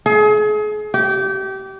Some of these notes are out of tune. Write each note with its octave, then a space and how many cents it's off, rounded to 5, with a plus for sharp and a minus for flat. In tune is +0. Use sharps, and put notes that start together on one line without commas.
G#4 +35
G4 -25